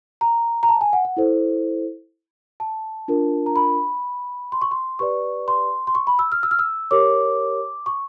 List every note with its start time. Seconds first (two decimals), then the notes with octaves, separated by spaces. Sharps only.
0.21 A#5
0.63 A#5
0.69 A5
0.81 G#5
0.93 F#5
1.05 F#5
1.17 E4 A4 C5
2.60 A5
3.08 D4 F4 A#4
3.46 A#5
3.56 B5
4.52 C6
4.62 C#6
4.71 C6
4.99 G4 B4 D5 C#6
5.48 C6
5.87 C6
5.95 C#6
6.07 B5
6.19 E6
6.32 F6
6.43 E6
6.51 F6
6.59 E6
6.91 G4 A#4 C#5 D6
7.86 C#6